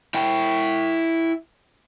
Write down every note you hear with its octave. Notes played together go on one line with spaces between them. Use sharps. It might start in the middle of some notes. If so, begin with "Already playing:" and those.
E4 G5